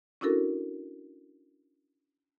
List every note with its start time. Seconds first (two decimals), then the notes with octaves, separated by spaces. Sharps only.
0.21 C#4 D4 E4 F#4 A4 A#4